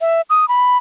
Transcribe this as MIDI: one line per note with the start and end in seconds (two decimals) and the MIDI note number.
0.01 0.21 76
0.30 0.48 87
0.48 0.78 83